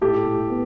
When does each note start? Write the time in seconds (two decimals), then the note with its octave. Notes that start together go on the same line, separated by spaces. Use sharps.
0.01 A2 G4 A4
0.26 A2
0.50 B3